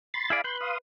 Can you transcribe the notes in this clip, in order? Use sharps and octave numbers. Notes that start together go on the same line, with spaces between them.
B5 C6 A6
E4 G#4 D5 F5 B5
B4 B5 C6 G6
F5 C6 D#6